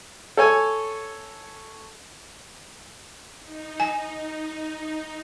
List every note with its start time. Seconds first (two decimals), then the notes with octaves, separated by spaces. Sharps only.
0.37 A4 C#5 G#5
3.39 D#4
3.80 G#5